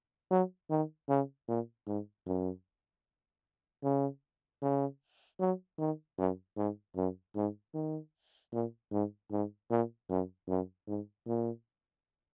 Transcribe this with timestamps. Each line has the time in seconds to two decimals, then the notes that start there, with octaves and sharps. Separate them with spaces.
0.30 F#3
0.70 D#3
1.09 C#3
1.48 A#2
1.87 G#2
2.26 F#2
3.83 C#3
4.62 C#3
5.40 F#3
5.79 D#3
6.18 F#2
6.57 G#2
6.96 F#2
7.36 G#2
7.74 D#3
8.53 A#2
8.91 G#2
9.31 G#2
9.70 A#2
10.10 F#2
10.48 F#2
10.87 G#2
11.27 A#2